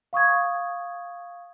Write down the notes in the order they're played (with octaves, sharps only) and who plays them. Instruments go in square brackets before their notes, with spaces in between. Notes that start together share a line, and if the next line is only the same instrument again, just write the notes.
[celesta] F5 C#6 D#6 G#6